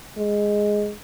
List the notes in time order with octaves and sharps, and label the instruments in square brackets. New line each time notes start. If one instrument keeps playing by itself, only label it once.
[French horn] G#3